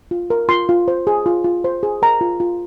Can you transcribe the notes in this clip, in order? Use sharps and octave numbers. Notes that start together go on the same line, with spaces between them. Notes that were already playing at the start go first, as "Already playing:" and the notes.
F4
A#4
F4 C6
F4
C5
G#4
F4
F4
C5
G#4
A#4 A#5
F4
F4